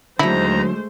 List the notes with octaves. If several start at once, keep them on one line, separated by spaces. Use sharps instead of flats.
D#2 D3 F#3 G#3 A3 E4 C5 A#5